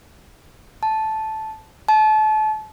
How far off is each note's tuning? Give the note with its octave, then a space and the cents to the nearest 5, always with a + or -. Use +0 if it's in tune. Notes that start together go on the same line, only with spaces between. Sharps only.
A5 -10
A5 -30